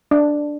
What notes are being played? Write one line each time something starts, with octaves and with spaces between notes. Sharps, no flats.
D4